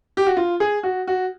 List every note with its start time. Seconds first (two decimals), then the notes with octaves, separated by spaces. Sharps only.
0.17 G4
0.27 F#4
0.37 F4
0.60 G#4
0.83 F#4
1.07 F#4